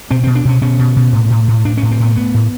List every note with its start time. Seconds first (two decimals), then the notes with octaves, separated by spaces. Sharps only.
0.10 B2 C4
0.23 B2 C4
0.35 D4
0.45 B2 C#4
0.61 B2 C#4
0.79 B2
0.96 B2
1.13 A2
1.30 A2
1.48 A2
1.65 A2 D4
1.77 C#4
1.83 A2
1.91 C4
2.00 A2 B3
2.16 A2 B3
2.34 A2